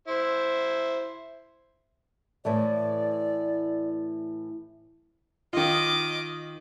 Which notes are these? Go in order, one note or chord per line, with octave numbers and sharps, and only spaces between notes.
E4 C5
A2 E3 A3 D5
D#3 F4 D#5 D6